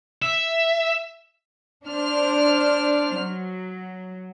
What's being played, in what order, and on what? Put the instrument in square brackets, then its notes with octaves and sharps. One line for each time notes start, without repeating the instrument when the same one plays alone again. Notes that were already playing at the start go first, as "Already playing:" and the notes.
[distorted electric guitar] E5
[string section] D4 C5 F6
F#3